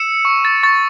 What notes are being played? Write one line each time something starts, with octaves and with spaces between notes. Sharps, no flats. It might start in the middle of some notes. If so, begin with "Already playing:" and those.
Already playing: E6 C#7 E7
C#6
A6
C#6 A6